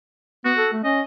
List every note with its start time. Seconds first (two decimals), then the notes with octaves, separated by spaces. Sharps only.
0.45 B3 F#4
0.57 A4
0.73 A3
0.84 C#4 D#5